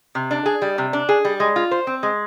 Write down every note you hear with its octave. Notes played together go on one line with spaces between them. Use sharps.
C3
D4
G#4
G3
C3
D4
G#4
G3
G#3
F4
C5
C4
G#3